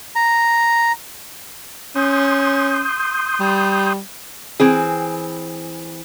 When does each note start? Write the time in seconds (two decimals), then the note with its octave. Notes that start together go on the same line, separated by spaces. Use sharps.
0.16 A#5
1.95 C#4 C6 D#6 G6
3.40 G3
4.60 E3 C4 G#4